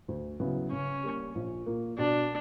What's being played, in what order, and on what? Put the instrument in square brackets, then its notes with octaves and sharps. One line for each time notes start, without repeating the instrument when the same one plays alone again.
[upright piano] D2
C#3 F#3 B3 E4
[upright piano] C#3 [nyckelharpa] C#4
[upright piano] G3 A#3
A#1
A#2 A#3
[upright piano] B2 [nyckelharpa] D4